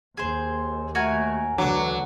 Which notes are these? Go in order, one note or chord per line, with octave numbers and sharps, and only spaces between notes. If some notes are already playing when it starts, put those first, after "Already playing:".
D#2 G#4 C5
A3 F#4 A#4 G#5
D2 D3 E3 F#3 D4 D6